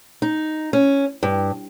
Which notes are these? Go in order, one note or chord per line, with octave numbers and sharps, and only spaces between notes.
D#4
C#4
G2